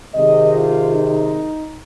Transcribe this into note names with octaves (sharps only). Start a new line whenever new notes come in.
C3 D#3 G#3 D#5
F4
D#4